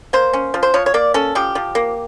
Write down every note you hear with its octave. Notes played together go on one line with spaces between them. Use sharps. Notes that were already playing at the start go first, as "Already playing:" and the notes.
A#3 C5
C#4
F3
C5
F3 C#5
C#5
A#3 D5
C#4 A4
F3 G4
F3
A#3